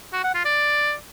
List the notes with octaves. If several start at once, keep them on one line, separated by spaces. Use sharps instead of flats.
F#4
F#5
F4
D5